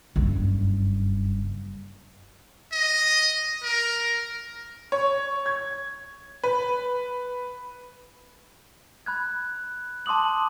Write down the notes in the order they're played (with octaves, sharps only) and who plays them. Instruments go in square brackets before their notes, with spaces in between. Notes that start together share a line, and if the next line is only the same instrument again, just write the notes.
[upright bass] F#1 G2
[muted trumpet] D#5
A#4
[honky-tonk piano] C#5
G#6
B4
[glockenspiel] B5 F#6 G#6
A5 C6 D6 D#6 F#7